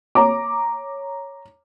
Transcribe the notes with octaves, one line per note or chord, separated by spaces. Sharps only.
C#5 A#5 D6